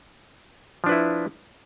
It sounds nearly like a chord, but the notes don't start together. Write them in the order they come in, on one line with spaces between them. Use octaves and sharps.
F3 D4 B4 E4